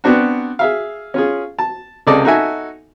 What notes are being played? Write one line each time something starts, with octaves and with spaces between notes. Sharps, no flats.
B3 C4 D4 F#4
G#4 E5 F5
C#4 F4 G#4
A5
C#2 C3 G#4 A4 D5 D#5
D#4 F#4 A4 E5 G#5